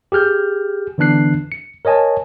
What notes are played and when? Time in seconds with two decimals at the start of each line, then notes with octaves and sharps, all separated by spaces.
0.12 G4 G#4 F6 G6
0.98 D3 E3 B3 D4 F#6 C7
1.52 C#7
1.85 A#4 C#5 D#5 G#5 A5